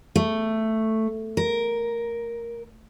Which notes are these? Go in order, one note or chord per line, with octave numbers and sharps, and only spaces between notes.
A3
A#4